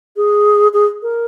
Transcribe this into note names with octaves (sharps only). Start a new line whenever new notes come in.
G#4
G#4
A#4